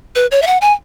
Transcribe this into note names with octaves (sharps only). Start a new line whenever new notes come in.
B4
C#5
E5
F#5
G#5